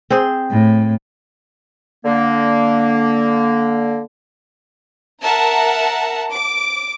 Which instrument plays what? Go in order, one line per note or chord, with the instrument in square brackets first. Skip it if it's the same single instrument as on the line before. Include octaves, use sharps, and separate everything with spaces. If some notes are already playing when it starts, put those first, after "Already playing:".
[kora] C4 G#4 C5
[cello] A2
[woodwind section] D3 A#3
[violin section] A#4 E5 F#5 A5 A#5
D6